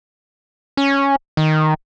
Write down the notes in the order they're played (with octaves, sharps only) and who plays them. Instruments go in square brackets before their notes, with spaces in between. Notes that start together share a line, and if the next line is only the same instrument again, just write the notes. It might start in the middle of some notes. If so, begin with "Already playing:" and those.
[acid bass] C#4
D#3